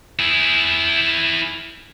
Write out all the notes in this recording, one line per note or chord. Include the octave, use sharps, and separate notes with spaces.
E4 G#4